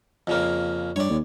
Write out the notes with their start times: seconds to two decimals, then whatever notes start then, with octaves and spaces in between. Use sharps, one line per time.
0.27 F2 C#3 A#3
0.96 G2 C#5 D5
1.10 D#2